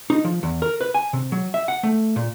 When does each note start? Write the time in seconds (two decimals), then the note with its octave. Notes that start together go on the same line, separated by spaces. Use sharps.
0.10 D#4
0.24 F3
0.43 E2
0.62 A#4
0.81 B4
0.94 G#5
1.13 C3
1.32 F#3
1.54 E5
1.68 F#5
1.83 A3
2.16 A#2